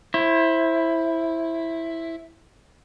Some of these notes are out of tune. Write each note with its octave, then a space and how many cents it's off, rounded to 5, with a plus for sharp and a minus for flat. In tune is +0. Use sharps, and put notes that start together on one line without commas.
E4 +0 C5 +25